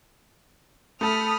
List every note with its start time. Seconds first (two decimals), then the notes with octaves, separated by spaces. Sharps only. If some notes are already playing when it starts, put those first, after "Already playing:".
1.01 A3 A4 B5 D#6 F6